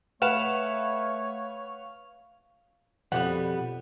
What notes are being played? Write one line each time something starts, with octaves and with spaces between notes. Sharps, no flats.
A3 B4 C#5 F5 F#5 E7
F2 B2 G3 A#3 B3 F#5